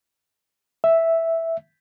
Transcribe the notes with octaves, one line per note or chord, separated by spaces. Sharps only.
E5